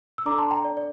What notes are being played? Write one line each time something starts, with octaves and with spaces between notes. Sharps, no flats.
E6
D4 A4 D5 A#5 D6
A5 C6
G5 A#5
D5
D5